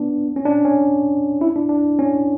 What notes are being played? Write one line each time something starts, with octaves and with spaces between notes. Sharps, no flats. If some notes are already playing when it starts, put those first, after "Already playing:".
Already playing: B3 D4
C#4
D4
C#4
E4
D4
D4
C#4